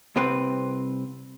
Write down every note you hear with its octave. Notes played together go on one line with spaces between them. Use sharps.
C2 C3 C4 B4